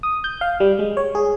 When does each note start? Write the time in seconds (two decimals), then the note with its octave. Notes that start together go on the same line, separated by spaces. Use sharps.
0.03 D#6
0.24 G6
0.41 F5
0.60 G3
0.79 G#3
0.97 C#5
1.15 G#4